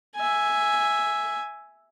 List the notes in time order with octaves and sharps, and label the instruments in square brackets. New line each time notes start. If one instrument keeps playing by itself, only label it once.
[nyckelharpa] E5 G#5